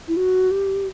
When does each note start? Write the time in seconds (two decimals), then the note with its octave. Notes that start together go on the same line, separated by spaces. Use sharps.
0.08 E4
0.17 F#4
0.51 G4